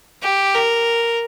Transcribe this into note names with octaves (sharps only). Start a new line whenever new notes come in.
G4
A#4